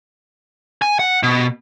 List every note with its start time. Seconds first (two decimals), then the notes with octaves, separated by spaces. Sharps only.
0.82 G#5
0.99 F#5
1.23 B2